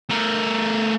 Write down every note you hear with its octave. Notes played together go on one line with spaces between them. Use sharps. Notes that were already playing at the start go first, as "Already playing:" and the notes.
A3 A#4